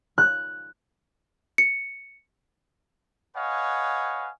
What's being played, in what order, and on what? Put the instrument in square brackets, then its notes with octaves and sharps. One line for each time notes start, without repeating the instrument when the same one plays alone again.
[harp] F#6
[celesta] C#7
[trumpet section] B4 C#5 D#5 F5 F#5 G#5